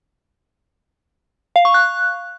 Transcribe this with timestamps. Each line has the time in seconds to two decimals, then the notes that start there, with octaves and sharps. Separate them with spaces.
1.56 F5
1.65 C#6
1.74 F#6